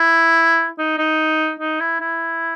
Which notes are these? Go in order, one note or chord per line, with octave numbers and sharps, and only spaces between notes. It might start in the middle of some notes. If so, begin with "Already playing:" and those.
Already playing: E4
D#4
D#4
D#4
E4
E4